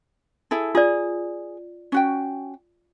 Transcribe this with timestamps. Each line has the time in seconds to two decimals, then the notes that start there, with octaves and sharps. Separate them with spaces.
0.51 E4 G#4 A4
0.75 F4 G#4 D5
1.92 C#4 F#4 G5